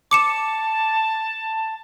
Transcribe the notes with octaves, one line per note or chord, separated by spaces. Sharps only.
A5 D6 C#7 E7